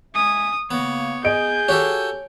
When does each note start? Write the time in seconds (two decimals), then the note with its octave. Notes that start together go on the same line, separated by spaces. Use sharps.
0.15 G#3 E5 G#5 D#6
0.71 C#3 A#3 B3 C#5
1.24 G#4 D#5 G#5 G6 D7
1.69 F#4 G4 A4 C#5